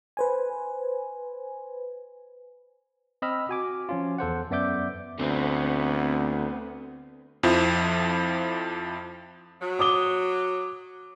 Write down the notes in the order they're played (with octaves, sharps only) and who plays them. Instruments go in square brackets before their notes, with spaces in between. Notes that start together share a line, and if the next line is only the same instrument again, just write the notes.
[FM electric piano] B4 C5 G#5
[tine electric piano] C4 D#5 B5 E6 F6
F#4 G#5 D6
F3 C#4 F4
E2 A4 C5 F#5
F#2 B3 D5 E5 D6 G6
[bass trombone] D2 [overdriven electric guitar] B3 C4
[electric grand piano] F2 F3 E4
[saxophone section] F#3
[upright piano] D6 D#6 G7